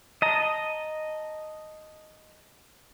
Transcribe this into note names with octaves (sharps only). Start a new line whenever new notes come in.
D#5 A5 A#5